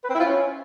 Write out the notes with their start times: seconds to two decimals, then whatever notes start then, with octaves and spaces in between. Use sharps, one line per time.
0.04 B4
0.09 C4
0.15 E4
0.20 F4
0.25 C#4